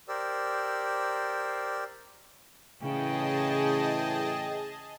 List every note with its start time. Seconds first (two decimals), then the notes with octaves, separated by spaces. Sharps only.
0.08 G4 A#4 C5 D5 E6
2.82 A2 C#3 E3 G#4 D#5 G5 A5